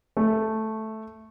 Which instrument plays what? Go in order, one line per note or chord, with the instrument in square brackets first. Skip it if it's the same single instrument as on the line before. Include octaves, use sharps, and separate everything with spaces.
[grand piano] A3